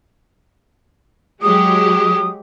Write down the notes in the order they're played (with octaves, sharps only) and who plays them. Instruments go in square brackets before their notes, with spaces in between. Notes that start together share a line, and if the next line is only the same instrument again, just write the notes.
[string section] F#3 G#3 G4 [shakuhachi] D#6